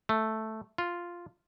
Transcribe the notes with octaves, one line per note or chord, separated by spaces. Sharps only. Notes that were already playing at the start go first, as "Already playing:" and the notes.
A3
F4